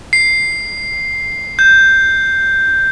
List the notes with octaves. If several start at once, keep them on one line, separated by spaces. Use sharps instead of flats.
C7
G6